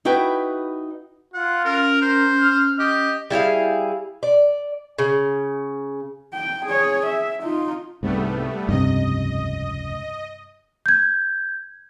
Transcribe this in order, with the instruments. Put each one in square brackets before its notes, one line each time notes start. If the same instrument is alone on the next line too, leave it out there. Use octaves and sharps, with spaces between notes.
[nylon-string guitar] D#4 E4 F#4 B4 G5
[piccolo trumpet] F4 [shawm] F#5
[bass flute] C#4 [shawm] A#4
[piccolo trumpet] A#4 [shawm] C5
[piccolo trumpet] F6
[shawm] G4 [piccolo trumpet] D#5
[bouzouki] G3 E4 G#4 F5
D5
C#3
[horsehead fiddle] G5
G#4 C#5
E5
D#4 F4
[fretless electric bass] C2 G#2 C3 [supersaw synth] G3 A3 B3
[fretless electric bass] F1 C#2 [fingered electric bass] G2 C3 [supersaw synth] D#5
[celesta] G6 G#6